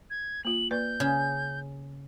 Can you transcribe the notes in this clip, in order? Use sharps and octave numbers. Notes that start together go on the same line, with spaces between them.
G#6
A#3 F4 F#7
A#3 B4 D5 G6
C#3